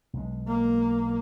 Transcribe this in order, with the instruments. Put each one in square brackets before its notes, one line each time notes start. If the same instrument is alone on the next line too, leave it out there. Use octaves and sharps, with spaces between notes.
[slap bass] B1 G#3
[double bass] A#3